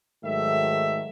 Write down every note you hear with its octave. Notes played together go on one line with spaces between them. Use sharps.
G#2 D#3 F#3 A3 E5